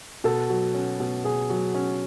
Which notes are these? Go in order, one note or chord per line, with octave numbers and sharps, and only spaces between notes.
B2 A4
F#3
C#4
B2
B2 G#4
F#3
C#4